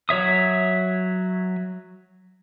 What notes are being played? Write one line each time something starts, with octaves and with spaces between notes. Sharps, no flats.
F#3 C#5 E5 D#6